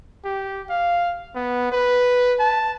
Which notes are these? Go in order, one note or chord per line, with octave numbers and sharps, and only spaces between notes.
G4
F5
B3
B4
A5